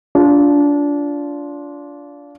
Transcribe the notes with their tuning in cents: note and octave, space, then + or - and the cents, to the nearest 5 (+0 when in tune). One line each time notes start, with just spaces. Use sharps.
D4 -25 F4 +0